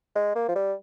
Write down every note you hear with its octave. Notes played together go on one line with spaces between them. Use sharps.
G#3
A#3
F3
G3